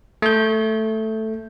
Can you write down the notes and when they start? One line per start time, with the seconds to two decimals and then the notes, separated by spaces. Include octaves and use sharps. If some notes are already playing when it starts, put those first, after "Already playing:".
0.22 A3 G6